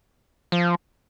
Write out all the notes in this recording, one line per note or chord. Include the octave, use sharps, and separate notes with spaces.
F3